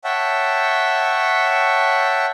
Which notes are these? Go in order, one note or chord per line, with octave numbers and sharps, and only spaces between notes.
C#5 E5 F#5 G5 A5